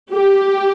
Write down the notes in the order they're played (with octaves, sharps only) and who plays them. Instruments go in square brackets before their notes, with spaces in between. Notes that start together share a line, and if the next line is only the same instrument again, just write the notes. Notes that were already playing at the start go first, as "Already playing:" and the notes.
[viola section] G4